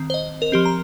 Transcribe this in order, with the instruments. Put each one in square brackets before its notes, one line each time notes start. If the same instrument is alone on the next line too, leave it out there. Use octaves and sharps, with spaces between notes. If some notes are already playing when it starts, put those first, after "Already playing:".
Already playing: [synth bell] D#3 C4
C5
D#5
A#4
F3 C4 G4
A#5